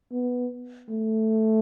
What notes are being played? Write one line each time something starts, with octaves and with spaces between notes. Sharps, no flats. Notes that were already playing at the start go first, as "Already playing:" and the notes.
B3
A3